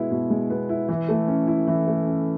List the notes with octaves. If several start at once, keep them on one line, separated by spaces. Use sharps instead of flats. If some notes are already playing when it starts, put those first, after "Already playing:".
Already playing: B2 G#3 B3 E4
B2
G#3
B3
E4
E3
A3
C#4
E4
E3
A3
C#4